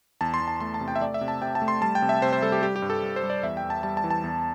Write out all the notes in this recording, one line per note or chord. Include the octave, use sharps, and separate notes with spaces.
E2 A5
C6
E2
A5
A3 C6
A5
C3
G5
E5
A3 D5
E5
C3
A5
C3 G5
A5
A3
C6
G3 A5
G5
C3
E5
C3 C5
C5
G3 A4
G4
G3 G4
G4
G2
A4
G2
C5
G3
D5
E2 E5
G5
E2
A5
G3 A5
A5
E3
A5
E2